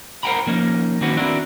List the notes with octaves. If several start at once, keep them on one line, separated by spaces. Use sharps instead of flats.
A#4 C5 F#5 G5 A#5 B5
F3 A#3 C#4 D#4
D#3 A#3 C4 C#4 F#4 B4
C4 D4 E4 F#4 A#4